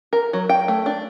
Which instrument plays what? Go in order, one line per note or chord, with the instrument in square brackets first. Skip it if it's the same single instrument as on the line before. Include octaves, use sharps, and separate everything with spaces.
[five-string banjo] A#4
F#3
G5
A3
D4